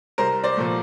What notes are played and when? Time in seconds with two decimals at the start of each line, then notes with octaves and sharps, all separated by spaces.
0.18 C2 A#4 C5
0.44 C5 D5
0.57 A#2 F3 A3